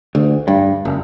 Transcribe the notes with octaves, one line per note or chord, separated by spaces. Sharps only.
D2
G2
F#1